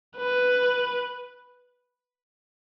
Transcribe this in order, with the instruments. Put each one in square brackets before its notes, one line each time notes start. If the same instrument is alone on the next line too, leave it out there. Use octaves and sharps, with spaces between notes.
[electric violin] B4